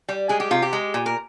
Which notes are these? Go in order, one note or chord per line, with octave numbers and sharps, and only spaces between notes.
G3
G#3 G#4
G4
C3 F4
G4
G#3
A#2
A#4